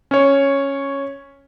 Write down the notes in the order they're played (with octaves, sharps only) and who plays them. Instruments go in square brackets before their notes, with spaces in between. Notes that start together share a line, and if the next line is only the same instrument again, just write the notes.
[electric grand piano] C#4 C#5